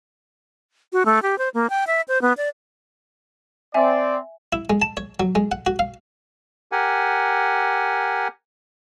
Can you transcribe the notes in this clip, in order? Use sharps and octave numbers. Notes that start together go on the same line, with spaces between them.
F#4
A3
G4
C5
A#3
G5
E5
C5
B3
D5
C4 D5 E5 G#5
E4
G#3
A5
C#5
F#3
G#3
F#5
F#4
F5
G4 A#4 F#5 G#5